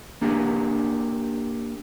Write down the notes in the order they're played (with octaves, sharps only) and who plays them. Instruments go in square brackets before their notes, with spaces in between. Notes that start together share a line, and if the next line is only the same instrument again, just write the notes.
[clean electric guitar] A#3 D4 G4 G#4